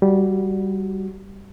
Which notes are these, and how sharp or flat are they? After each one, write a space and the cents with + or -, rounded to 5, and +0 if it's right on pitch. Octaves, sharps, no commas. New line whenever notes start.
G3 -10 F#4 +0